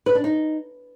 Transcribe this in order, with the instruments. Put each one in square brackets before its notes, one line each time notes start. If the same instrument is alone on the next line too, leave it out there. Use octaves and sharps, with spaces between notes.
[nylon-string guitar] B4
D4
D#4